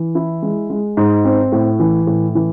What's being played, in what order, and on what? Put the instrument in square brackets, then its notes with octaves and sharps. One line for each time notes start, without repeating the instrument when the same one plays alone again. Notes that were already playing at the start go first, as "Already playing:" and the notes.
Already playing: [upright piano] E3
E4
G#3
G#3
G#2
C4
A2
E3
A2
E3